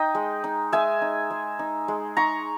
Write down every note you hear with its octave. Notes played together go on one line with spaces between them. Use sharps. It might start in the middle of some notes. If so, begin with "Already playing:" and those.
Already playing: D#4 D#5 G5
G#3
D#4
G#3 E5 G#5
D#4
G#3
D#4
G#3
D#4 A#5 C#6